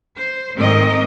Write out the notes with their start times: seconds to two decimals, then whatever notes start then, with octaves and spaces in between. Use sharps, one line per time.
0.17 C5
0.56 G#2 D#3 A3 C4 A#4 D#5